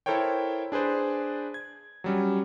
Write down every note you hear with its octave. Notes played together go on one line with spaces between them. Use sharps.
E4 A4 A#4 C5 C#5 G5
D4 G#4 B4 C5 D5
G#6
F#3 G3 C#4